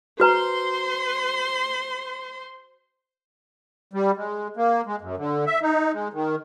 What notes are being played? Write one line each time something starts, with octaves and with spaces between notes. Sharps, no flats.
F#4 B4 C5 A#5 C6
G3
G#3
A#3
G#3
F#2
D3
E5
D#4
G#3
D#3